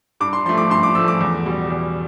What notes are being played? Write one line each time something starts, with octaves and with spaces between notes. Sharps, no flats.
G2 D6
C6
F3 A3 C6
D6
G2 C6
D6
F3 A3 E6
D6
E2
B2 G3
E2